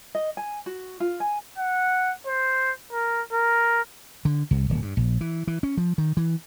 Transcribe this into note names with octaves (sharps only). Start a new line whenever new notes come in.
D#5
G#5
F#4
F4
G#5
F#5
C5
A#4
A#4
D3
C2
D1
G2
A#1
E3
E3
C#4
F3
D#3
E3